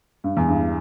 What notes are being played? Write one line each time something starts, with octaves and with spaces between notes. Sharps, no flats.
G2
E2
G2